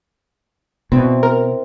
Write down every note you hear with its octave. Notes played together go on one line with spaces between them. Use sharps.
B2 C4 E4
A#4